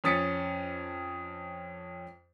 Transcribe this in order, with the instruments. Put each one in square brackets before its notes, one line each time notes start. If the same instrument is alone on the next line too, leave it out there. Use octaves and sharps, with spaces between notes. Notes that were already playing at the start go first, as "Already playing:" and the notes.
[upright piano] F2 C#4 D#6 A6 B6 C#7